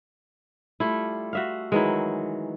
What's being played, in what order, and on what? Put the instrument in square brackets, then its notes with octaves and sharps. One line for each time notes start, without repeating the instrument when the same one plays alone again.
[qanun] G3 A3 F4 [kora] E4
[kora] F#4 E5 F5
[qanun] D#3 E3 F#3 [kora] G#3 E4